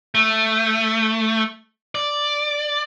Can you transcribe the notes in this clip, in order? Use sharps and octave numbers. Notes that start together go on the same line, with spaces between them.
A3
D5